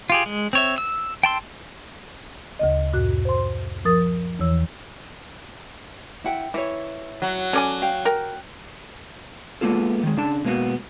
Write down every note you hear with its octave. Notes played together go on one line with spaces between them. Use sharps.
F4 G4 G#4
G#3
C4 C#5 E5
E6
G5 A5 C6 E6
D2 C#3 D#5
F#2 A#2 F#4 F#6
C5 C6
F3 A#4 D#6 A6
E2 E3 C#5 E6
E4 F#5 G5
E3 E4 C#5
F#3
C#4 A4 D5 G#5
F5 G5
A#4 G5
G#3 A#3 B3 F4 A4
D#3 G#3
C#3 D4 A5
B2 G#3 A#3 B3 F#4